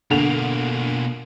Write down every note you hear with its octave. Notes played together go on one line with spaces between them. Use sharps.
B2 D3 A#3 F7